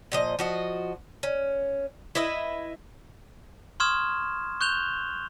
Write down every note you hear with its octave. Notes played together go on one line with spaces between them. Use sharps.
A#2 F3 D#5
F3 F#4 D#5
C#4
E4 B4 D#5 E5
C6 C#6 D#6 F6 G#6 E7
C#6 F#6 G6 E7 F7 G7